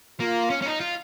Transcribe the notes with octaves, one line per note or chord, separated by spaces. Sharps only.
A#3 F4
C#4
C#4
D#4
F4